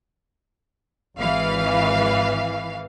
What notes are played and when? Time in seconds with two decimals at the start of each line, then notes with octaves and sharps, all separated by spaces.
1.18 G#1 E3 F5